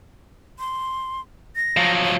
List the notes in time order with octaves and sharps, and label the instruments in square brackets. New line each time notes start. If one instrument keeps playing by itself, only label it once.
[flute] C6
A#6
[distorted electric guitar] F3 F#3
[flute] C#5